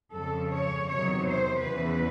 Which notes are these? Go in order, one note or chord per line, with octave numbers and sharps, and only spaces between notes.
F2 C#3 F3 A4
C#5
E2 C3 D#3 F#3 C#5
C5
E2 C#3 E3 B4